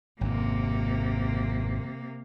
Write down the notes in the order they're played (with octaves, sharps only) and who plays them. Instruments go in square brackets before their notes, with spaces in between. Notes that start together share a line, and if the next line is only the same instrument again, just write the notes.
[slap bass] G#1 F2 [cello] C3 A#3